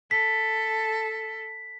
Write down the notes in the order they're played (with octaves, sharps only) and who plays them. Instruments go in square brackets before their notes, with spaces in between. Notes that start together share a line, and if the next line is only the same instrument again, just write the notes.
[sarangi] A4 [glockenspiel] B6